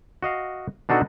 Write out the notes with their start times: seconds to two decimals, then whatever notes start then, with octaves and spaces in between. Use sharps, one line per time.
0.23 F#4 D#5 F5
0.89 B2 D4 D#4 F#4 A4 F#5